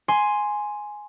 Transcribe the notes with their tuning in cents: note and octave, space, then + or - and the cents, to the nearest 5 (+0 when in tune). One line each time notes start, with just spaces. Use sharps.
G#5 +5 C6 +0